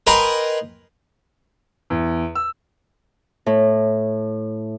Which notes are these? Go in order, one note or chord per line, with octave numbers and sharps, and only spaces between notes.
A#4 B4 D#5 G5 G#5 C6
E2
E6
A2